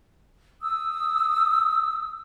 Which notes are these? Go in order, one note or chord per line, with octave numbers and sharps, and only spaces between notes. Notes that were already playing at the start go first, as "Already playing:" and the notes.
D#6 E6